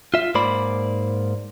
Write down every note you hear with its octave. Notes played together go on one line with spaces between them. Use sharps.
F4 E5
G#2 A#3 C5 D5 B5